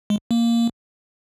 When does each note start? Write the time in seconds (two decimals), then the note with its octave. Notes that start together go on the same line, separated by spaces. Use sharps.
0.10 G#3
0.31 A#3